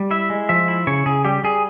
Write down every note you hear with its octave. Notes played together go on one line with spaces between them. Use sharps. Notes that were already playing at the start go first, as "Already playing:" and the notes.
Already playing: G3
E4 E5
G#3
F3 E5
E4
C#3 C#5
C#3 G#4
G3 G4
G3 G#4